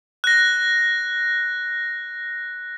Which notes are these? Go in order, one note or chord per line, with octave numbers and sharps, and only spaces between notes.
F#6 A#6